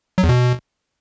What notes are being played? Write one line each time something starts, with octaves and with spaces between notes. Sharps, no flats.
F#3
E2
B2